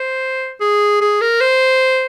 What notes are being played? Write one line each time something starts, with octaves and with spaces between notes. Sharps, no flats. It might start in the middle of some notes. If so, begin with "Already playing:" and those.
Already playing: C5
G#4
G#4
A#4
C5